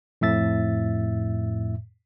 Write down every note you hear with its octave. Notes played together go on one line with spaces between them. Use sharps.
F2 A2 E5 A6